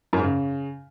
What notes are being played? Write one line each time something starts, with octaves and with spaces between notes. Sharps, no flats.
F#2
G#2
C#3